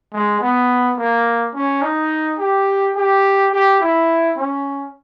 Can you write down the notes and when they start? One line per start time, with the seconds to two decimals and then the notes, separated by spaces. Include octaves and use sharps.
0.13 G#3
0.40 B3
0.97 A#3
1.54 C#4
1.82 D#4
2.38 G4
2.95 G4
3.51 G4
3.80 E4
4.36 C#4